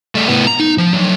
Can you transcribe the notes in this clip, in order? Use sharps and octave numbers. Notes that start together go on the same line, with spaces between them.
G3 A3
A2 B3
A#5
D#4
F3
D3 F#3